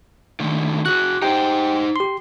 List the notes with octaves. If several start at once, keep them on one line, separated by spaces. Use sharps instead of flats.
D3 D#3 A3
F#4 G#4 F#6
D#4 G4 C5 G5
G4 C6